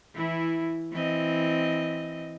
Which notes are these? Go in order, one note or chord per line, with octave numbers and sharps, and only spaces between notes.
E3 E4
E3 C4 D#5